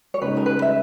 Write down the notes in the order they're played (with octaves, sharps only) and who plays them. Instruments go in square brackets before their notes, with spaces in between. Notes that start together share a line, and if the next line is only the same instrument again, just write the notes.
[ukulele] C#5
[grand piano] C#3 G#3 D#4 [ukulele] B4
[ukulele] A#4
B4
E5